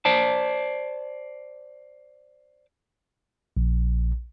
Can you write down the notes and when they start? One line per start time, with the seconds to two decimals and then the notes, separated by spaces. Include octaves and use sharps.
0.05 C5 D5 A5
3.57 A#1